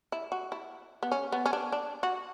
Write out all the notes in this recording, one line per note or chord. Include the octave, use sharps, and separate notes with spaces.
E4
F#4
E4
B3
C#4
B3
C#4
D4
D4
F#4